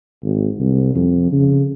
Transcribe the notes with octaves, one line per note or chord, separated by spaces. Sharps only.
G#1
C2
F2
C#3